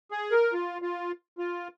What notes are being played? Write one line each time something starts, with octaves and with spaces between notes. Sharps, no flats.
G#4
A#4
F4
F4
F4